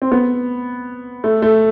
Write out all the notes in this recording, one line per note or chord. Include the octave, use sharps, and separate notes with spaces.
C4
B3
A3
A3